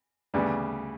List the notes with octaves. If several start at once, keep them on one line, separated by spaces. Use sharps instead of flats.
D2 C#3 G3 B3 D4